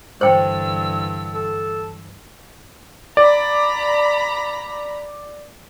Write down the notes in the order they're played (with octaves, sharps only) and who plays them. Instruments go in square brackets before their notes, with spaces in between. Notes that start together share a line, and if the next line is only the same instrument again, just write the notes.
[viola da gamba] G2 D3 E3 [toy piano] C5 G5 [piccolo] E6
[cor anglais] A4
[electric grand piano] D5 [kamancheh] A#5 B5